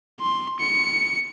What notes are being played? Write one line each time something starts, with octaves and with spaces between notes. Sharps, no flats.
C6
C#7